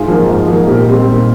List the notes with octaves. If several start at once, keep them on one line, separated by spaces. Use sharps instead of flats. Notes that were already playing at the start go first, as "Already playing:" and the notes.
Already playing: G#2 F4 G#4
F3 A#3 D#4
G#2
F3 A#3 D#4
A#2 G4 A#4
G3 C4 D#4
A#2